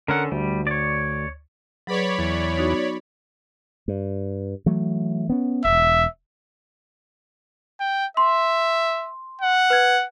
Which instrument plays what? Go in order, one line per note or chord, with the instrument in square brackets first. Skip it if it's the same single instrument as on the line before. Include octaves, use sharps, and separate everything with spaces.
[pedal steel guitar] D3 C#4 A4 [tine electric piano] A#4 F#5
[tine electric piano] D2 [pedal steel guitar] G3
[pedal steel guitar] C#5 D5
[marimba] F#3 G#4 B4 [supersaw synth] C#5 D5 B5
[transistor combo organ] E2
[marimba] B3 D#4 F#4
[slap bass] G2
E3 F#3 A3
B3 C#4
[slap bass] E1 [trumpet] E5
[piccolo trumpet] G5
[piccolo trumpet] E5 [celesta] C6
[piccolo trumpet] F#5
[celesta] B4 G#6